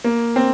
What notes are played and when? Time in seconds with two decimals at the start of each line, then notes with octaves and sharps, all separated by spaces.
0.04 A#3
0.36 C4